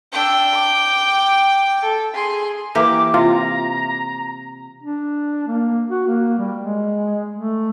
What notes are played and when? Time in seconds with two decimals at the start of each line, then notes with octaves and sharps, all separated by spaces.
0.13 D4 G5 E6
0.53 D6
1.81 A4
2.14 G#4 C6
2.75 E3 A#3 G4 D6
3.14 C3 F4 A#5
4.83 D4
5.47 A#3
5.90 F#4
6.06 A#3
6.38 G3
6.59 G#3
7.36 A3